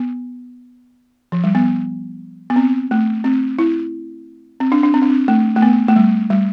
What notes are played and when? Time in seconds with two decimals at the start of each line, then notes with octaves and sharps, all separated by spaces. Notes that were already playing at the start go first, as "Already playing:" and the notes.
Already playing: B3
1.32 F3
1.44 G3
1.55 B3
2.50 B3
2.56 C4
2.91 A3
3.24 C4
3.59 E4
4.60 C4
4.72 D4
4.83 D4
4.94 C4
5.02 D4
5.10 C4
5.28 A3
5.56 A3
5.62 B3
5.88 A3
5.96 G3
6.30 G3